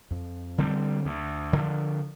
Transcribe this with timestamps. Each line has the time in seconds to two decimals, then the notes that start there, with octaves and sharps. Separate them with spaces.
0.11 F2
0.58 D3 G3 C4
1.05 D2
1.53 D3 F3